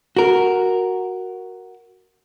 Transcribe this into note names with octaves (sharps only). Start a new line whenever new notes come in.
F#4 A#4